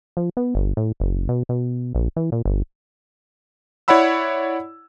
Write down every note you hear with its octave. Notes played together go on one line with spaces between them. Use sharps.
F3
B3
G1
A2
F#1
B2
B2
A#1
E3
A#2
G1
E4 C#5 D5 F#5 B5 E6